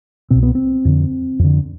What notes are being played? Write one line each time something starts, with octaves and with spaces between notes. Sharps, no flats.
C2 B2 C4
B3
C4
F2 D3
F2 D3